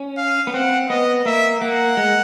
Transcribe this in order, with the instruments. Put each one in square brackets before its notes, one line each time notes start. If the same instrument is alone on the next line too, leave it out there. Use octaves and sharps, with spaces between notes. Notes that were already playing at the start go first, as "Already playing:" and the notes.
Already playing: [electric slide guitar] C#4
[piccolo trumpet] F5
[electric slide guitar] B3
[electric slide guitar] C4 [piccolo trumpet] F#5
[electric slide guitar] B3 [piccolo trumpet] D#5
[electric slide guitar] A#3 [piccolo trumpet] E5
[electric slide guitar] A#3 [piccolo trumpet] F#5
[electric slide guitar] G#3